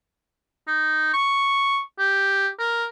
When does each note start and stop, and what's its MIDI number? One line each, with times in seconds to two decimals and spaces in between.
0.68 1.10 63
1.14 1.80 85
1.99 2.48 67
2.59 2.86 70